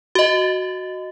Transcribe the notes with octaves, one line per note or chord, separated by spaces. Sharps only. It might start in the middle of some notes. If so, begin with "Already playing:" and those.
F#4 D#5